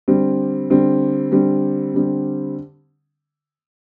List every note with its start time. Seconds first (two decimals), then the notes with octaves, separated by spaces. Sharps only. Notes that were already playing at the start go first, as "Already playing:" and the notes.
0.08 D3 G3 C4
0.70 D3 G3 C4
1.32 D3 G3 C4
1.94 D3 G3 C4